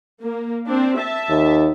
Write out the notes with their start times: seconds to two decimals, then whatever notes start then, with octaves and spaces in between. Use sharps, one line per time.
0.22 A#3
0.67 C4 D4
0.97 E5 A5
1.29 D#2